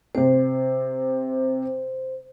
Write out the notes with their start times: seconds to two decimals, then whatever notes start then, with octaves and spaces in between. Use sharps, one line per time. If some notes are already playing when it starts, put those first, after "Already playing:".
0.15 C3 C4 C5